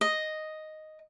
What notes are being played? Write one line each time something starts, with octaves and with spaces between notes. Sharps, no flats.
D#5